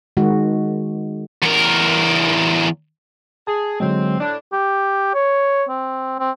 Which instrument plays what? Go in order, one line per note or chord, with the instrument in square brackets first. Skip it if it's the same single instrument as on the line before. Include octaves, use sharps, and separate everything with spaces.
[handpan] D#3 G#3 F#4
[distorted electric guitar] E2 A#4
[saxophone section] G#4 [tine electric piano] A5
[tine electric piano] D3 F#3 G#3 [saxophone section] C4
[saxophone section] A2 D4
[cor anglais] G4
C#5
C4
C4